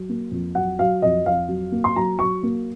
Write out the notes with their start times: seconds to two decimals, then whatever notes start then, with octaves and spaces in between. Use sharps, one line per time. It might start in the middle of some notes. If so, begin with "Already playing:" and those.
Already playing: F#3
0.09 A#3
0.31 F2
0.55 F#3 F#5
0.79 F#3 F5
1.02 F2 D#5
1.25 F2 F5
1.48 F#3
1.72 A#3
1.84 C6
1.96 F#3 A#5
2.19 F#3 C#6
2.43 A#3